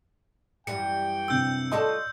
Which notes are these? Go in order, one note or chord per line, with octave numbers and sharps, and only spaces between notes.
F#2 E3 G3 G5 C#7
C3 D4 E6 G6 D7
F4 F#4 A4 D5 D#5 C6